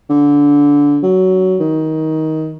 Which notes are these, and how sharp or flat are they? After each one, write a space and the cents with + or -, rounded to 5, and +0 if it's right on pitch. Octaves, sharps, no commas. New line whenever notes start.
D3 -20
F#3 +15
D#3 +20